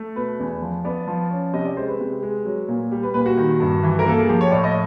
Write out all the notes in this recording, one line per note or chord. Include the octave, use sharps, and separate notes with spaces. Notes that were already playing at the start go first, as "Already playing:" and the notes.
Already playing: A3
B2 B4
E2
F3
B3 D5
F3
C#4
C3 D#5
D5
G#3 C5
B4
C3
G#3
F#3
A#2
G3
B4
A#2 B4
F#4
D#3
G2
E3
A#4
A#3 A4
G#4
F3 G4
C#5
A2 D5
D#5